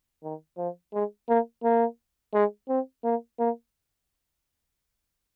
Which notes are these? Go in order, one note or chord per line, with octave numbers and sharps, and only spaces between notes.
D#3
F3
G#3
A#3
A#3
G#3
C4
A#3
A#3